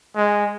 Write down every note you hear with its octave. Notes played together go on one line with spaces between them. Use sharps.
G#3